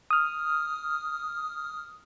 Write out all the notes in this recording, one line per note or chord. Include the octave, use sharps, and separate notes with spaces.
D#6 F6